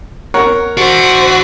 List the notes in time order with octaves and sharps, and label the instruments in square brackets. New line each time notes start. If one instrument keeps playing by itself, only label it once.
[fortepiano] A#4 C#5 F#5
[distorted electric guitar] E3 D4 [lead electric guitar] F#4 [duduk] C5